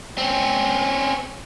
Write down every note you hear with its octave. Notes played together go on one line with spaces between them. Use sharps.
C4 C#4